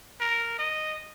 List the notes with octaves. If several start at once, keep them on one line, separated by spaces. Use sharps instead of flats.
A#4
D#5